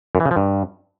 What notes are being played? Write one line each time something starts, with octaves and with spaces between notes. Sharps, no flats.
F#2
E3
C#3
F3
G2